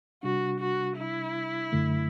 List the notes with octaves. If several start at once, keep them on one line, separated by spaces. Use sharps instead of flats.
C3 G3 D4 F#4
F#4
E4
F#2 D3 A3